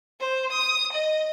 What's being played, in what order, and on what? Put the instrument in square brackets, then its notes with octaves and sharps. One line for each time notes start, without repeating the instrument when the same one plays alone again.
[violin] C5
D#6
D#5